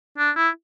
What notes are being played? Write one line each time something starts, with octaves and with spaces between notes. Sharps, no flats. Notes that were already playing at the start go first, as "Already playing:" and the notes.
D4
E4